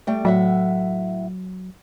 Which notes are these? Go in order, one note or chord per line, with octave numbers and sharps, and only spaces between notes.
G3 A3 G5
A2 F#3 E5 F#5